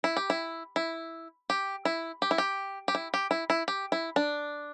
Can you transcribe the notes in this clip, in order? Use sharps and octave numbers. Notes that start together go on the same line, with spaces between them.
E4
G4
E4
E4
G4
E4
G4
E4
G4
G4
E4
G4
E4
E4
G4
E4
D4